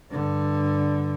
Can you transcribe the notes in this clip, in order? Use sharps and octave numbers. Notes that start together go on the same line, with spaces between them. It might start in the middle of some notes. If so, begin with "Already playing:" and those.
G2 D3